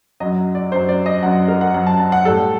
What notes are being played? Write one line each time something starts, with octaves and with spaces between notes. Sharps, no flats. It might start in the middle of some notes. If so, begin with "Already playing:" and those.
F#2 F#3 D#5
D5
F#2 F#3 C5
D5
D#5
F#2 F#3 F#5
A#4
F#5
F#2 F#3 F#5
A5
A5
F#5
A2 G3 A4